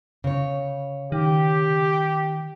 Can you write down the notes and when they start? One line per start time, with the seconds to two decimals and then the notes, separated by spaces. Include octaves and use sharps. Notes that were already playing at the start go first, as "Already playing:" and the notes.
0.24 C#3 C#5
1.12 D#3 G4